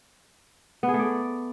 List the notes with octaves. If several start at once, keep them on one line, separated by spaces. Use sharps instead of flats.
B3
G#4
A3
D5